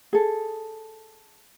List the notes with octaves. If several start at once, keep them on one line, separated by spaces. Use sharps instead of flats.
G#4 A4